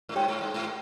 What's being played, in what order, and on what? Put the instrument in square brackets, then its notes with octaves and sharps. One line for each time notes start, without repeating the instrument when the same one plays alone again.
[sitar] G#2
[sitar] G2 [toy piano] G4 C#5 G5 C#6
[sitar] G#2
G2
G#2